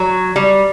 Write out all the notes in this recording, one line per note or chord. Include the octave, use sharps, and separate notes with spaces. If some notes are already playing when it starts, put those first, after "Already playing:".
Already playing: F#3
G3